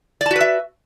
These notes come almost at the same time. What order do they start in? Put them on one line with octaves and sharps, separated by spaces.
D5 A5 F#4 B4 E5